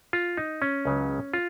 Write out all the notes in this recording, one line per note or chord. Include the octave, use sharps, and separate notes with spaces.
F4
D#4
C#4
C#2 C#3 F#3
F4